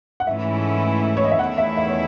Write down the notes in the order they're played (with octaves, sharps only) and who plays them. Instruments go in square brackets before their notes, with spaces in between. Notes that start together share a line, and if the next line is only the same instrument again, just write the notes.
[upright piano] F#5
[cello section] G#2 E3 A3 C#4 E4 [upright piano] E5
[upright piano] C#5
D#5
E5
[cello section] E2 D#3 A3 E4 [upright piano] F#5
[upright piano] E5
E5
C#5